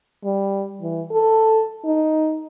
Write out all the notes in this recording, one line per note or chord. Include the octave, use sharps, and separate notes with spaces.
G3
E3
A4
D#4